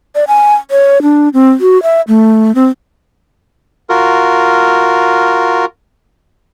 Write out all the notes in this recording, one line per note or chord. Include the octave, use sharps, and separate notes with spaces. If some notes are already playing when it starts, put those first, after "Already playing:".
D5
G#5
C#5
D4
C4
F#4
E5
A3
C4
F4 F#4 A#4